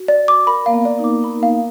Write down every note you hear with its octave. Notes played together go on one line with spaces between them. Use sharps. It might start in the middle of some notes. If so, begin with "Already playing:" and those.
Already playing: F#4
D5
D6
A#4 B5
A#3 F5
B3
D5
D#4
D6
D#4 B5
F5